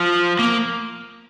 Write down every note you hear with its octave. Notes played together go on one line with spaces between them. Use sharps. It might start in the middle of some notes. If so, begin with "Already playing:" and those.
Already playing: F3
A#3